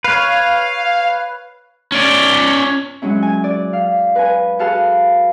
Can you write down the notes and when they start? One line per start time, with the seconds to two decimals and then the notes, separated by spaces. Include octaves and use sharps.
0.04 B4 C#5 F5
1.92 C#4 D5
3.02 F#3 G#3 C#4 E4
3.23 G#5
3.44 D5
3.73 F5
4.15 B4 G#5
4.59 F#4 G#4 A4 B4 F5 A5